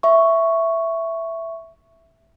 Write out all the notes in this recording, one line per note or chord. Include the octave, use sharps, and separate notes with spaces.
E5 C#6